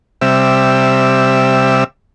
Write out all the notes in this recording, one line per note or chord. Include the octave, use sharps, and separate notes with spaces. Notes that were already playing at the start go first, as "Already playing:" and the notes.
C3 G3 E5